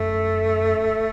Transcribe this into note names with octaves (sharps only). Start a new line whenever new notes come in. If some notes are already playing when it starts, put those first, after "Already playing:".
Already playing: F#2 A3